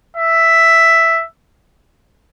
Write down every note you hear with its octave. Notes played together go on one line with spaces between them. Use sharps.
E5